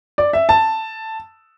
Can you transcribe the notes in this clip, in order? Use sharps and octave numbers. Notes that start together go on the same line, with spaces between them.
D5
E5
A5